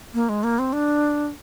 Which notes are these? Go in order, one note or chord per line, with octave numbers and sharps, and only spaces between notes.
A#3
G#3
A#3
C4
D4